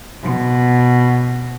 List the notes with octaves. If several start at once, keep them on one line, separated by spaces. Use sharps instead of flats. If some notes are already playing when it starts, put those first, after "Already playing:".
B2